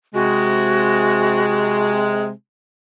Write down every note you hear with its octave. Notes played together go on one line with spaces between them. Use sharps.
C3 G#3 F#4